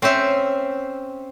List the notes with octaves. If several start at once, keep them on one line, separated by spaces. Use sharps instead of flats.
C4 C#4 C5 E5